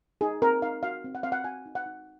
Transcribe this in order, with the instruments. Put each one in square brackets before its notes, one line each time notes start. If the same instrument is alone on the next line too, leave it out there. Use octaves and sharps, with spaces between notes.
[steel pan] D#4 G#4
C4 A#4
D#4 F5
F#4 F5
C4
F#5
C4 F5
F#5
F#4 G#5
D#4
F#5
D#4